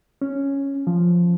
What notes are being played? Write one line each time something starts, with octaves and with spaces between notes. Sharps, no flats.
C#4
F3